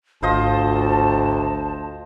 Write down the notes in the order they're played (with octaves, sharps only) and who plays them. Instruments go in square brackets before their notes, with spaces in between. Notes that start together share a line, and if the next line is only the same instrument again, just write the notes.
[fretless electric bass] G#1 [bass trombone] D2 [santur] F4 C5 D#5 [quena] A5